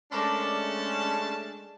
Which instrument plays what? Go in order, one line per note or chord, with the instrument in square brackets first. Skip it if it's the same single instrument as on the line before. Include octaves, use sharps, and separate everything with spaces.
[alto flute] G#3 [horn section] A3 D4 A5 [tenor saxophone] C#4 [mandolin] A#4 D5 C6